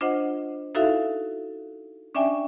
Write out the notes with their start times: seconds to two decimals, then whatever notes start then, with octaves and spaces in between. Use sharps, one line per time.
0.01 D4 F4 C5 D#5 F#5
0.75 D#4 E4 F#4 A4 E5 F5
2.15 C#4 D4 D5 E5 G5 G#5